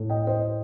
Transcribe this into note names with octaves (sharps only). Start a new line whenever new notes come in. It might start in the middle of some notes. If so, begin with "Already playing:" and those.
Already playing: A2 A3
D#5 G5
C5 D#5